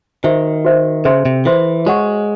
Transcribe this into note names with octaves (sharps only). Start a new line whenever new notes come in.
D#3 F#4 C5 E5
F#4 C5 E5
C#3 A4 C5 E5 C6
C3
E3 A4 C5 E5 C6
G#3 F#4 C#5 F#5 C#6